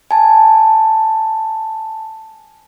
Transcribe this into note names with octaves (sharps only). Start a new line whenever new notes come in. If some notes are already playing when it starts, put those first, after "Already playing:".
G#5 A5